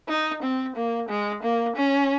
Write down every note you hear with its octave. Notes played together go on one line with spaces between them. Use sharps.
D#4
C4
A#3
G#3
A#3
C#4